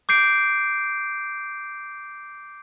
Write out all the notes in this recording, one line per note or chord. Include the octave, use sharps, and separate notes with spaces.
D6 G6 C7 D7